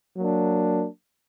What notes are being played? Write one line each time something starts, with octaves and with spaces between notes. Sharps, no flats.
F#3 A#3 D4